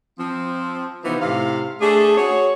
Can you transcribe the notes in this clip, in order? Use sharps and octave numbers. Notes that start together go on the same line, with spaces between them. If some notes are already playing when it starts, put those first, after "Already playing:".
F3 C4
C3 E3 F3 B3 D#4
A2 C3 F5
A3 D4 G#4
F#4 G#4 C#5